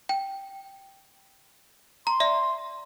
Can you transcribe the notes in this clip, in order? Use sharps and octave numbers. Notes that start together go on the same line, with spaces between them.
G5
A#5 C6
D5 E5